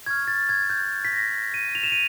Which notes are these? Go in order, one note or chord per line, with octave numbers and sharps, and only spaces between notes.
C#6 F6 G#6
A6
G#6
G6
B6
A#6
D#7
F7
E7
D#7